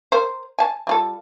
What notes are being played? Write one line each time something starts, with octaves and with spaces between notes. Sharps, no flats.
A#4 C5
G#5 A5
G3 F4 A4